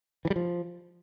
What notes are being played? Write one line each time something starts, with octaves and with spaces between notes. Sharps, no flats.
E3
G3
F3